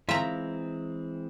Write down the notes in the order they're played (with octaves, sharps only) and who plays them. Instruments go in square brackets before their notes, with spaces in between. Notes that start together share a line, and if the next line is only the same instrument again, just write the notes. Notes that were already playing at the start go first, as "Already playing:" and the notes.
[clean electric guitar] E3 G#3 C4 [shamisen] F4 [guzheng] E5 A#5